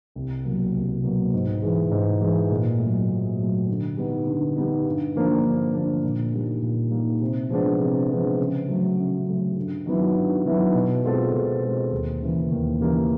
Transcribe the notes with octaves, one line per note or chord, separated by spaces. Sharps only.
C2
B2 F#3 A#3
C2
B2 F#3 A#3
G#2
E3 G#3
G#2
E3 G#3
A#2
A3
F#3
A#2
F#3 A3
D3
G3 B3 D#4
D3
G3 B3 D#4
G2
D3 F3 A#3 D4
G2
D3 F3 A#3 D4
A#2
G3 A#3 D#4
A#2
G3 A#3 D#4
C3
F3 G#3 B3 D4
C3
F3 G#3 B3 D4
C#3
F#3 A3
C#3
F#3 A3
G2
D#3 F#3 B3 E4
G2
D#3 F#3 B3 E4
B2
G#3 C4 F4 A4
B2
G#3 C4 F4 A4
D#2
C#3 E3 G3 A#3
D#2
C#3 E3 G3 A#3